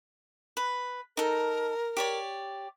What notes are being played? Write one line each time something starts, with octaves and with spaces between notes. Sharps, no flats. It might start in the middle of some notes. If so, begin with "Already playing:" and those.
B4
D#4 A4 A#4
G4 C#5 D5